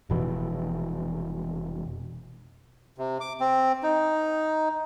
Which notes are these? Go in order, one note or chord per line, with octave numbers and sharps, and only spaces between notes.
F1 B2 E3
C3
D6
C4
D#4